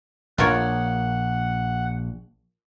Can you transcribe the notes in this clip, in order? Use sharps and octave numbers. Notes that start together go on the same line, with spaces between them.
A#1 F4 A#4 C#5 F#5